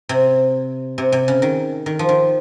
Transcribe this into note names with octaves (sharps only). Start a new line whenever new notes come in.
C3
C3
C3
C#3
D#3
D#3
F3
D#3